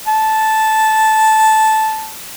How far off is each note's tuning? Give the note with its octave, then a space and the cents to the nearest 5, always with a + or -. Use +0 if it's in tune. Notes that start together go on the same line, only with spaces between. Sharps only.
A5 -10